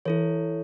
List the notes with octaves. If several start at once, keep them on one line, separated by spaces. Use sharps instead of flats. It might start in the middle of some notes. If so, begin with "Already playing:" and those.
E3 E4 A4 C#5